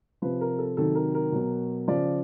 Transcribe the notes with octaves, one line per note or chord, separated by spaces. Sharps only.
C3 F3 B4
A#4
A4
C3 D#3 F#3 A4
A#4
A#4
B2 F#3
C#3 F3 D5